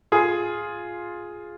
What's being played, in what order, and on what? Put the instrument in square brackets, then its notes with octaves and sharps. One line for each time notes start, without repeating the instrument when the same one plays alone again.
[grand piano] F4 G#4